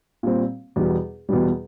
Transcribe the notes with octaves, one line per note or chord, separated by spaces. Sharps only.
A#2 G3 C4
E2 B2 G3
E2 B2 G3